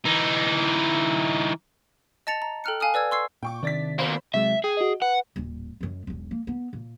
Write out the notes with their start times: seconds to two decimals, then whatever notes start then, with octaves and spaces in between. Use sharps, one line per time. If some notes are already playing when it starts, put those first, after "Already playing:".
0.05 E3 D#4
2.27 D#5 A5 A6 C#7 F7
2.42 A#5
2.64 A4 G5 A#5 F6 F#6 C#7
2.80 F5 G#5 A5 D#6 F6
2.94 B4 D5 E6 G#6
3.11 C6 C#6 E6 G#6 C7
3.43 A#2 G5 C#6 D6
3.63 C3 D#3 D4 D5 A6 B6
3.99 B2 A#3 C5 B5
4.34 C3 F#3 G#3 E5
4.64 G#4 G5
4.77 F#4 D#5
5.02 B4 F#5
5.36 D#1 A1
5.81 F#2 D#3
6.07 E1 B1
6.31 A#3
6.47 B3
6.73 A#2